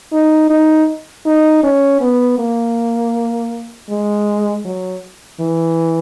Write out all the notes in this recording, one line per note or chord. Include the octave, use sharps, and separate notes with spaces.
D#4
D#4
D#4
C#4
B3
A#3
G#3
F#3
E3